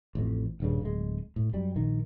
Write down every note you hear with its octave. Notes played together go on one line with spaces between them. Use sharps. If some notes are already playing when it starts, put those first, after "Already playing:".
A1 F2
D#1 G2 C#3
D1 G#3
A2
F#2 G3
A#1 D#3